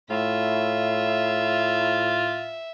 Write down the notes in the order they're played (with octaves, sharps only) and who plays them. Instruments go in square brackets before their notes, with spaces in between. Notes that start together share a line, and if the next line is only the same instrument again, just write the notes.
[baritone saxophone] A2 [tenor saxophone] F4 [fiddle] E5